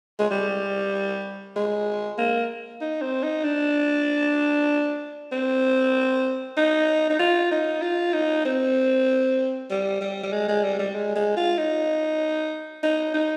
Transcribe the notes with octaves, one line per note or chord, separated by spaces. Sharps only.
G#3
G3
G#3
A#3
D#4
C4
D#4
D4
C4
D#4
D#4
F4
D#4
F4
D#4
C4
G3
G3
G3
G#3
G#3
G3
G3
G#3
G#3
F4
D#4
D#4
D#4